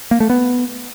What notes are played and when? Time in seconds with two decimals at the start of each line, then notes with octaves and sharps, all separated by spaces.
0.11 A#3
0.20 A3
0.30 B3